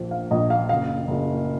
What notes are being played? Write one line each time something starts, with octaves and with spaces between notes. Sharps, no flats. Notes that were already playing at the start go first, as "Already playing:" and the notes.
Already playing: A#1 F3
F5
A#1 D#5
F5
F#1 F5
F#1